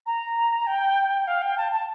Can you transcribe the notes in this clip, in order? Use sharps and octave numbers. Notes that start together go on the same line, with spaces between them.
A#5
G5
F5
G5
A5
A5